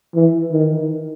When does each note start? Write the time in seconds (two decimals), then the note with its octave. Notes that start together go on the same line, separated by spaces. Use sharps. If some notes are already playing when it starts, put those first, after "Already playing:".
0.15 E3
0.52 D#3